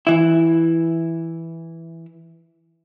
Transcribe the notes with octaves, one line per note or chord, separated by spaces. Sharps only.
E3 E4